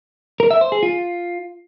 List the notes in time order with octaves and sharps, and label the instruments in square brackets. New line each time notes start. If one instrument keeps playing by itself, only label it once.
[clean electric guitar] A#4
E5
C5
G#4
F4